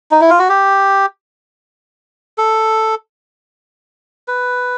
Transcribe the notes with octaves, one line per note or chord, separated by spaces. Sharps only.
D#4
E4
F4
F#4
G4
A4
B4